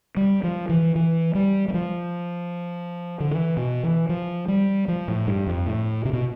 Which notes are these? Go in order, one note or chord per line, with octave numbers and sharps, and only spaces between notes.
G3
F3
E3
E3
G3
G3
F3
D3
E3
B2
E3
F3
G3
F3
A2
G2
F2
A2
C3
B2